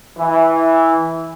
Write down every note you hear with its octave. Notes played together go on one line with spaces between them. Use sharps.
E3